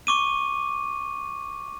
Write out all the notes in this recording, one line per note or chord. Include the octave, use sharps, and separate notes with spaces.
C#6 D6 D#7